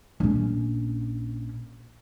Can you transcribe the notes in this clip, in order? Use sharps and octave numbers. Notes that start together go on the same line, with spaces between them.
A#1 C#4